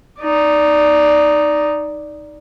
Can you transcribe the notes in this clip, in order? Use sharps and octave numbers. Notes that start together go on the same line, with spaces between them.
D#4 D5